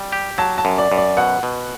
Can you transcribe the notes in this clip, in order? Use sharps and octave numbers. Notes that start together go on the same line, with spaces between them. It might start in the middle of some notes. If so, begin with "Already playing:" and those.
Already playing: G3 G5
G4
F#3 A5
A5
F#2
D5
F#2
D5
B2 F#5
B2